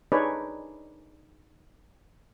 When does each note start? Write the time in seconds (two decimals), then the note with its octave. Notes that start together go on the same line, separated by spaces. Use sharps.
0.12 D4 D#4 G#4 B4 C#5 D5